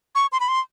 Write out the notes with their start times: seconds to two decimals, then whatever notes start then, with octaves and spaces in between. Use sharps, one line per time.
0.15 C#6
0.32 C6
0.40 B5
0.48 C6